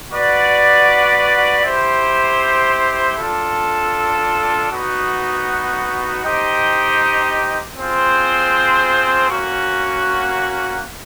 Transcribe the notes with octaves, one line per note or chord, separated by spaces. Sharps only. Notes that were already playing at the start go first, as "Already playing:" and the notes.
F#4 B4 D5 F#5
E4 G4 C5
D4 F4 A4
B3 D#4 F#4
D#4 G4 C5 D#5 G5
C4 F4 G#4 C5
A#3 C#4 F#4